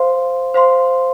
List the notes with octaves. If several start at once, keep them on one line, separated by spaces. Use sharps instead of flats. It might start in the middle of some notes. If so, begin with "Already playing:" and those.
Already playing: C5 F5 C6
C5 F5 C6